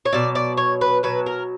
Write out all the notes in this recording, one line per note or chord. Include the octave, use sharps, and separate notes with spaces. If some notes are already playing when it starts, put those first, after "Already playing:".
C#5
B2 F#3 D5
D5
C#5
B4
B2 F#3 B4
A#4